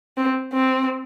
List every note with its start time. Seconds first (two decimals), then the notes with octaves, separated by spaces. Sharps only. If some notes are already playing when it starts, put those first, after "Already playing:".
0.17 C4
0.53 C4